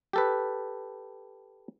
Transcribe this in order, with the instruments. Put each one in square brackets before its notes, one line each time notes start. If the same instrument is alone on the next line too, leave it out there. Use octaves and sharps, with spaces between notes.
[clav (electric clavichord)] G4 A4 B4